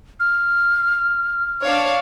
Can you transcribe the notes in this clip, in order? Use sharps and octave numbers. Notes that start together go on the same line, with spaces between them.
F6
D4 C#5 F5